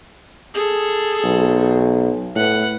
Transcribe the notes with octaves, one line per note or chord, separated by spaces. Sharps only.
G#4 A4
B1
A2 B4 F#5